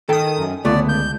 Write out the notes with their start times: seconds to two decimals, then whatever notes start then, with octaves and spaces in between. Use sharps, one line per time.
0.09 D#3 A4 G5 D#6
0.38 F#2
0.65 C#2 D3 A3 B3 D5
0.89 G6